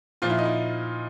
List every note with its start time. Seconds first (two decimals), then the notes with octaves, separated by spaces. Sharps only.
0.22 A#2 F3 F4
0.30 E4
0.38 D#4
0.45 E4